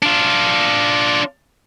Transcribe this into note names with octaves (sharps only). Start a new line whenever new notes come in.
D4 F4